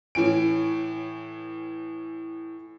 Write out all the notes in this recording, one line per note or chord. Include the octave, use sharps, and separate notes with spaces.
A2 E3 C#4 D7